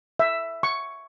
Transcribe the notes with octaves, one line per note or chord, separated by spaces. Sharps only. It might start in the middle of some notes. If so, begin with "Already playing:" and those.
E5
C#6